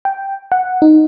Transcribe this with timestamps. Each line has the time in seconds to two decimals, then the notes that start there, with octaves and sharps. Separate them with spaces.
0.05 G5
0.52 F#5
0.82 D#4